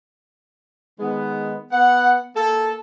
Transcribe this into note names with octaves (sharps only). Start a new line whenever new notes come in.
D#3 G#3 B3
B3 F#5
A#3 A4